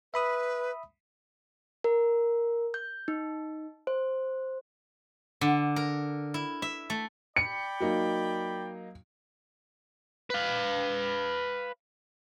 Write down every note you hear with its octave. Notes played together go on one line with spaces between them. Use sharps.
B4 E5 B5 D#6
A#4
G6
D#4
C5
D3
A#4
E4
E5
A3
D5 G5 B5 C#7
F#3 A#3 D#4
B4 F5